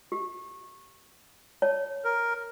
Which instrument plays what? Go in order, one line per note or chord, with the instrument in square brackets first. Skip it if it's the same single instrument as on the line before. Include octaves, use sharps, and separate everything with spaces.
[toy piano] G4
C#5 A5
[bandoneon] A#4